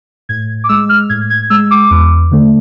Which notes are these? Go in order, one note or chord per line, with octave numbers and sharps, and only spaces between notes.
A2 G#6
D6
G#3 E6
F6
A2 G#6
G#6
G#3 E6
D6
E2
D3 A3